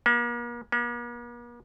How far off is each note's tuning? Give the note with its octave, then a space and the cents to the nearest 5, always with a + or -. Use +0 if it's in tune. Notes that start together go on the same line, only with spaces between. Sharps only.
A#3 +40
A#3 +45